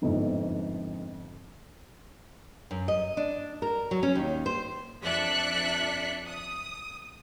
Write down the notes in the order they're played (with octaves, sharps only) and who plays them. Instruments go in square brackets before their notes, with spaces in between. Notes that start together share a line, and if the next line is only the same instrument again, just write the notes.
[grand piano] G1 F2 G#2
[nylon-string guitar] F#2
D#5
D4
A#4
F#3
C#4
D#2
C5
[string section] F2 D4 E5 F#6 B6 C#7
D#6